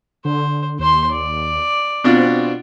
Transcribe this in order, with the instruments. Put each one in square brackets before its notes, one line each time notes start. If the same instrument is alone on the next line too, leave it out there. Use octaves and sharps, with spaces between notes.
[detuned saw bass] D3 [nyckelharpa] C5
[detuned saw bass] D#2 [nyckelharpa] C5 C6
[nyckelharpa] D5
[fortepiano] B2 D4 F4 [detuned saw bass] C4